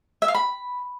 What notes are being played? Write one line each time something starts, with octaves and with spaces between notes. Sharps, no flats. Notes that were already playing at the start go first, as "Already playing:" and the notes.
E5
F5
B5